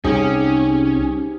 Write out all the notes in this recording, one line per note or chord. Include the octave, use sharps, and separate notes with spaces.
C2 C#4 D#4 G4 G#4 C5